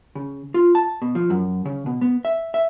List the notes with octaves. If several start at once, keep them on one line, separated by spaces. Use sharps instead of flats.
C#3
F4
A5
B2
F3
F#2
C#3
B2
B3
E5
E5